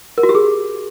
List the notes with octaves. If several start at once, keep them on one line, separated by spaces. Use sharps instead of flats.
A#4
F#4
G4
G#4